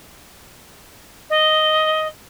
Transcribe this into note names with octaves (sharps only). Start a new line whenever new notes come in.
D#5